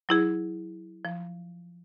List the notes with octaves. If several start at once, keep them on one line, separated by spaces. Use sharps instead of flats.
F#3 E4 G#4
F3